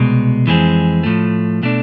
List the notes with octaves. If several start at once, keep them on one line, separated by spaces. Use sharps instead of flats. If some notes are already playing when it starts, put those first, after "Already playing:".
Already playing: C2 B2 G#3
F2 E3 G#3 C4 G#4
A2 F3 A3
B2 A3 D4